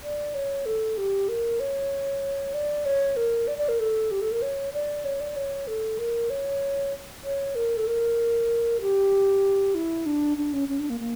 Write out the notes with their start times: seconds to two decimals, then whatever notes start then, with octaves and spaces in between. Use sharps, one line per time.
0.03 D5
0.35 C#5
0.66 A4
0.97 G4
1.29 A#4
1.60 C#5
2.54 D5
2.85 C#5
3.17 A#4
3.48 D5
3.58 D5
3.69 A#4
3.79 A4
4.11 G4
4.21 A4
4.32 A#4
4.42 C#5
4.73 D5
5.05 C#5
5.20 D5
5.36 C#5
5.67 A4
5.99 A#4
6.30 C#5
7.24 C#5
7.55 A#4
7.77 A4
7.87 A#4
8.81 G4
9.75 E4
10.06 D4
10.37 D4
10.53 C#4
10.69 C#4
10.79 D4
10.90 A#3
11.00 A#3